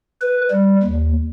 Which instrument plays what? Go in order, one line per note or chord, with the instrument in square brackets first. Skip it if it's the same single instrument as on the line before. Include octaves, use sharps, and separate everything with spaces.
[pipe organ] B4
G3
D#2